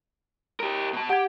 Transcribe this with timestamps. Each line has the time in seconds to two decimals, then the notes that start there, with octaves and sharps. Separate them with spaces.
0.60 G4 A#4
0.93 B2 A5
1.09 G4 F#5 G#6